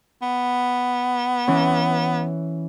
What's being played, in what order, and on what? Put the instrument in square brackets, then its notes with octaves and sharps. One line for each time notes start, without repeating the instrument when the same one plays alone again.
[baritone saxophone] B3
[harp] E3 C#4